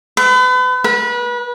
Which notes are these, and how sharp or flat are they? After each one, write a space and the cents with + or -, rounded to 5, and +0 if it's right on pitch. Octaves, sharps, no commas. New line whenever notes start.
B4 +35
B4 -30